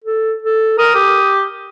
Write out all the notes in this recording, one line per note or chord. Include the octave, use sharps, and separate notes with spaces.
A4
A4
A#4 D#6
G4